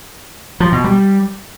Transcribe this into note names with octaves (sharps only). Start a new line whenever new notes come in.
F3
B2
G3